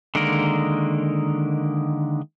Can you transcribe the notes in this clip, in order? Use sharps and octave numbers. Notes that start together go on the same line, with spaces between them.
D3 D#3 G#3 A#3 A#4